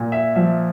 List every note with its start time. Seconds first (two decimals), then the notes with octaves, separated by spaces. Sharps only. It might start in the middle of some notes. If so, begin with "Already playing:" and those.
Already playing: A#2
0.12 E5
0.35 F3 E5